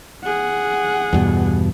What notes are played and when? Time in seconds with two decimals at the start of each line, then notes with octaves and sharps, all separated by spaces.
0.23 G#4 F#5
1.13 E2 G2 B2